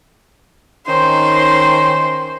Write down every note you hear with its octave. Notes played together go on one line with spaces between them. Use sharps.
D#3 C#4 D#4 C5